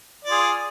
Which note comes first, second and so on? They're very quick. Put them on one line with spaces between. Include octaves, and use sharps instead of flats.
D5 F4 G#4